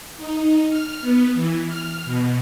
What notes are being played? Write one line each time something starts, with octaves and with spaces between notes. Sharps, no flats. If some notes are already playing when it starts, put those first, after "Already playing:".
D#4
F6
B3
E3
F6
B2